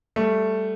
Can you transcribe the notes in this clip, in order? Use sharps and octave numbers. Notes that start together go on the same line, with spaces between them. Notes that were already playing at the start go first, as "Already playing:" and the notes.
G3 A3